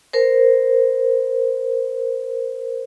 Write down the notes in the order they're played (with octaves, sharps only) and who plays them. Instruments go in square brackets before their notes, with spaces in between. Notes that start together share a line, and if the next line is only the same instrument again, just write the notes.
[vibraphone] A#4 C5